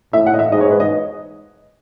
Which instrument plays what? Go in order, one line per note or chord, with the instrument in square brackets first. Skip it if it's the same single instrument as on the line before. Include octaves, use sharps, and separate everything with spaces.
[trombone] A2 [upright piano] E5
[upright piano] F#5
D#5
E5
[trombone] G#2 [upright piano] D#5
[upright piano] C#5
B4
D#5